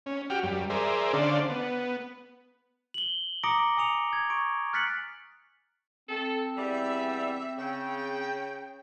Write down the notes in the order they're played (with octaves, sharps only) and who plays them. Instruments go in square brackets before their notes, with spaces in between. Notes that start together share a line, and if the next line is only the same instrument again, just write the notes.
[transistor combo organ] C#4
F#4 G4 G5 F6
F#2 G3
G#4 A#4 C5 D5 E5
D3 C#4 D4 C5 D5 F5
B3
[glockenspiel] F#7 G7
A#5 D6 D#6 A#6 C#7 D7
G#5 D#6 C#7 F7
G#6
C#6 D7
F6 F#6 A6 B6 C#7 F#7
[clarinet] C4 [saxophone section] A4
[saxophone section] E2 G3 [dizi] E5
[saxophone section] C#3 [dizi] G5